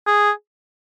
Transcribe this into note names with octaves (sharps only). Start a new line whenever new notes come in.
G#4